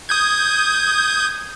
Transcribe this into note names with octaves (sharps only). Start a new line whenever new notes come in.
D#6 G6 G#6